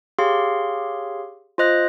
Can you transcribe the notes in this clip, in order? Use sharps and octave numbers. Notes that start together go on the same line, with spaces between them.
G4 G#4 C#5 F5 C6
F4 C5 D#5 F#6 A#6